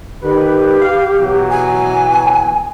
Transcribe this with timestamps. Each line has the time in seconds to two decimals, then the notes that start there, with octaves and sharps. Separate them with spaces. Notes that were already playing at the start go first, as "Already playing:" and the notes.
0.22 D#3 G4 B4
0.81 F5
1.19 B2 E3 F#3
1.49 G#5